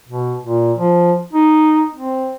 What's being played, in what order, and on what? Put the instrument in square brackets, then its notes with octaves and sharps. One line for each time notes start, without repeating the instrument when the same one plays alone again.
[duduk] B2
A#2
F3
D#4
C4